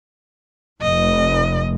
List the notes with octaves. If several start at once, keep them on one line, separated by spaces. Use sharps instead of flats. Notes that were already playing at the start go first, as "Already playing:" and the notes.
F1 D#5